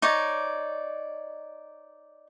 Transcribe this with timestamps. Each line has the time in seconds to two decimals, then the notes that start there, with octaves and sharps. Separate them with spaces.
0.02 D#4 C#5 D5